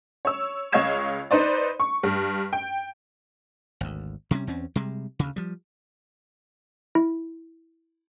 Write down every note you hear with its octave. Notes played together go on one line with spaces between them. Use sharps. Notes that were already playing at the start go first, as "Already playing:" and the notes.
C#5 E6
C#2 C#5 D#5 F5 G#6 E7
D#4 B4 C5 D5
C#6
G2
G5
G#1 D2
C3 G3 A#3 C#4
E2 C4 C#4
C3 G3 G#3
D2 C#3
F3 G3
E4